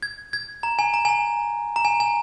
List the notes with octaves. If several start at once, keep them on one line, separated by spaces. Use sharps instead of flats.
G#6
G#6
A#5
G#5
A#5
G#5
A#5
A#5
G#5
G#5